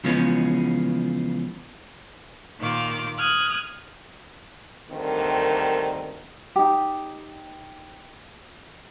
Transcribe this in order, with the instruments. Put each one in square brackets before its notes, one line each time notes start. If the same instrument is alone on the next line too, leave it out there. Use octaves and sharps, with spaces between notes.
[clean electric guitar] C#3 E3 F3 G#3 B3 C#4
[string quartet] A#2 D#3 F4 D6
D#6 F6 F#6 G#6
[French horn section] D2 G2 D#3 C4 A#4
[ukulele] D#4 G4